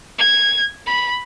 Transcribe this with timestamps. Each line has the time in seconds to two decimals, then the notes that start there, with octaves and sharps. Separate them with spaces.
0.18 G#6
0.87 B5